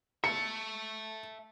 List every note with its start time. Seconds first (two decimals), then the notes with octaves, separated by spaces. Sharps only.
0.24 E5 A5 C#7